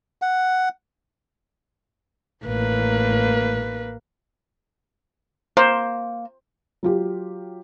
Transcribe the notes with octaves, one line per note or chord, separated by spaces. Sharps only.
F#5
A1 A#3 B4
A#3 C5
F#3 F4 G4